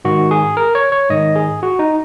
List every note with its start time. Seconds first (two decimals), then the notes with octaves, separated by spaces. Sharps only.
0.05 G#2 D#3 F#4
0.31 G#4
0.57 A#4
0.75 C#5
0.92 C#5
1.09 G#2 D#3 D#5
1.36 G#4
1.63 F#4
1.79 D#4